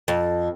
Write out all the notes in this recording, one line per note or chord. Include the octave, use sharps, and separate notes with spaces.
F2